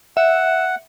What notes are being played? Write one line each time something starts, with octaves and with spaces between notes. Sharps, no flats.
E5 F#5